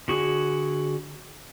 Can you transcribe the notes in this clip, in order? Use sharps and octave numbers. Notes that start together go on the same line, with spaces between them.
D3 F#4 G#4